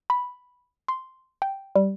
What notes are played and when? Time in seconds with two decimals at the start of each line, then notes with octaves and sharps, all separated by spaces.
0.10 B5
0.88 C6
1.42 G5
1.75 G3